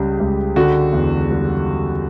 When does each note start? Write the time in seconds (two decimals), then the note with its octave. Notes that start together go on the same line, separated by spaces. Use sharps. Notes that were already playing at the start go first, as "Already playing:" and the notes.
Already playing: C#2 C#3 G3 G4
0.20 C#2
0.56 D3 F#4
0.93 E2
1.30 G3